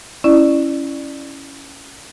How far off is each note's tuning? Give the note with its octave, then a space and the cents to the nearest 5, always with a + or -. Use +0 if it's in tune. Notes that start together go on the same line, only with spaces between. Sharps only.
C#4 +0 E4 +0 D5 +25